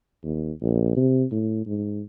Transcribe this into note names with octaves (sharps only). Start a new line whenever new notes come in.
D#2
A#1
C3
A2
G#2